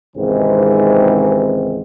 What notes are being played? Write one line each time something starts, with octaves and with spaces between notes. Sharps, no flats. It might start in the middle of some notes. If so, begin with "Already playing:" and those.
C#2 G#2 C3 D#3 E3 C4